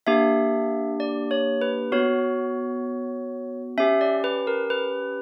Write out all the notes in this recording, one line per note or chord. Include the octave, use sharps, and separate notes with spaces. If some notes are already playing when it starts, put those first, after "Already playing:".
A#3 D4 G4 E5
D5
C#5
B4
B3 F#4 C#5
C#4 G4 E5
D5
B4
A#4
B4